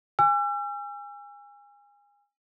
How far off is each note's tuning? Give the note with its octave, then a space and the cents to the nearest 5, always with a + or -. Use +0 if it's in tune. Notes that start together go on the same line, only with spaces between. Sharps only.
G#5 -25 E6 +40